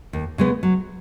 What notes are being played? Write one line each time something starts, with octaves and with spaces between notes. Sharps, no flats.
D#2
C#3 G#3 B3
F#3